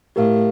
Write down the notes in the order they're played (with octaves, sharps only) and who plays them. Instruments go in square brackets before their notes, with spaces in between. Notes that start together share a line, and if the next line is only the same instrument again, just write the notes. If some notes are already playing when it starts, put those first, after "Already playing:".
[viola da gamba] A2 [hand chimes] G4 A#4 F5